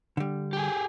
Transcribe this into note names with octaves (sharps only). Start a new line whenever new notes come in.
D3 G3
G4 G#4